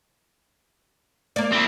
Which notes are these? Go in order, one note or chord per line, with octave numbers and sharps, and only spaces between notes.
A#3 D5
C4 E4